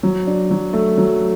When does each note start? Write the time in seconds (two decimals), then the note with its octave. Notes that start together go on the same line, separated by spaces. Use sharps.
0.03 F#3
0.27 D4
0.51 F#3
0.73 A3
0.97 F#3